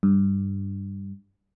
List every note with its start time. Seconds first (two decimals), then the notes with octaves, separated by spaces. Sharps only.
0.03 G2